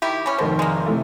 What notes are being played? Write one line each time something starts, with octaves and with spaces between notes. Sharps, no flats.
D#3 E4 G4
E3 C#4
F1 B2 D#3 C5
G#3 A#3
C3 E3 A3